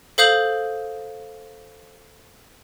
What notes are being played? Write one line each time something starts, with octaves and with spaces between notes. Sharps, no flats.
A4 C5 F5 D#6 G6 F#7